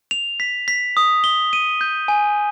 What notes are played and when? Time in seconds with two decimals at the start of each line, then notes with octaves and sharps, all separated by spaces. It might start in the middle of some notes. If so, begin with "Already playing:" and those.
0.11 F7
0.40 B6
0.68 B6
0.97 D#6
1.24 G7
1.53 D#7
1.81 G6
2.08 G#5